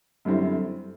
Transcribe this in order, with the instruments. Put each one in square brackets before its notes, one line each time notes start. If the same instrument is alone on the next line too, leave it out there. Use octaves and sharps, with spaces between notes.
[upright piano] F#2 D3 G3 C4 E4